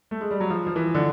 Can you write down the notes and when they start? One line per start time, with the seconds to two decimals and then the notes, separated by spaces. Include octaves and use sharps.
0.11 A3
0.21 G#3
0.31 G3
0.40 F#3
0.50 F3
0.67 F3
0.76 E3
0.95 D3